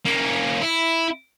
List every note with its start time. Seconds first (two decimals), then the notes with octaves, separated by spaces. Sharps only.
0.05 A#3 C#4
0.61 E4